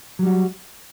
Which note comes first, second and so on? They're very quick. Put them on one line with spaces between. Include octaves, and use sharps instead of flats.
F#3 G3 F#4